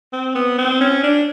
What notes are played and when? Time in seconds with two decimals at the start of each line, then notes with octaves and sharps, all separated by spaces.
0.13 C4
0.35 B3
0.58 C4
0.81 C#4
1.03 D4